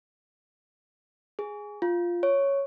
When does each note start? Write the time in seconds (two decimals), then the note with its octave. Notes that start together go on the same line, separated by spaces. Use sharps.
1.39 G#4
1.82 F4
2.23 C#5